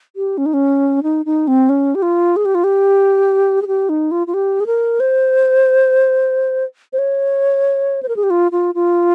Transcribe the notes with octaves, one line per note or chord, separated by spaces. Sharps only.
G4
C#4
D#4
C#4
D#4
D#4
C4
C#4
G4
F4
G#4
G4
F4
G4
G#4
G4
D#4
F4
F4
G4
G#4
A#4
C5
C5
C#5
C5
A#4
G#4
G4
F4
F4
F4